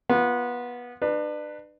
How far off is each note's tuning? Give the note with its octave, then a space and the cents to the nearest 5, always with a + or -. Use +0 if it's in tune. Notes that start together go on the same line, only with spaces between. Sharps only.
B3 -20 F4 +0
D4 +35 B4 +0